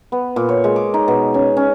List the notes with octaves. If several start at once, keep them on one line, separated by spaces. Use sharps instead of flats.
B3
A#2
C#5
G#3
D6
D#4
B2
C#4
C#4